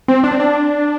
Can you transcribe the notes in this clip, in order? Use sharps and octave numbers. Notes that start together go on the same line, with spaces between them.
C4
D4
C4
D4